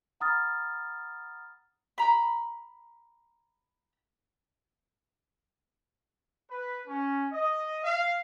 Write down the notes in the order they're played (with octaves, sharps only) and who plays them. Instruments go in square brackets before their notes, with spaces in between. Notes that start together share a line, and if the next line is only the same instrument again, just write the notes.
[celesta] F#5 A#5 B5 D#6 F6 A6
[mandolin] A#5 B5
[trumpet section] B4
C#4
D#5
F5